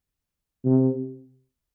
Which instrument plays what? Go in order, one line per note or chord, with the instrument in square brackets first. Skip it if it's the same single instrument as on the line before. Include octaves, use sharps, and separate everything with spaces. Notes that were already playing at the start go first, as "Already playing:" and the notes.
[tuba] C3